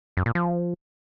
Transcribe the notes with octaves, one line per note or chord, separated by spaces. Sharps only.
F#2
A#2
F3